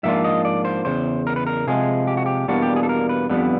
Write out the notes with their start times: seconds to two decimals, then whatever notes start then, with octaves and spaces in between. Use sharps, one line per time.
0.03 G#2 F3 A#3 D4 F4 E5
0.24 D#5
0.45 D5
0.65 C5
0.85 E2 C#3 C5
1.27 A#4
1.36 B4
1.47 A#4
1.67 C3 F3 G#3 G#4
2.07 G4
2.17 F#4
2.26 G4
2.48 E2 B2 G3 A#3 D4 F#4
2.62 G4
2.76 G#4
2.83 A4
2.89 A#4
3.09 B4
3.30 F2 D3 G3 B3 B4